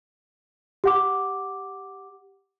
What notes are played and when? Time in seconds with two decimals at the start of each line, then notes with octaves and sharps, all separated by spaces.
0.84 G4 F#5 D6